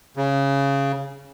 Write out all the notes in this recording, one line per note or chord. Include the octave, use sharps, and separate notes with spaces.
C#3